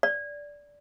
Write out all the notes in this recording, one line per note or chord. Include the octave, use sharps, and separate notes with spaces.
D5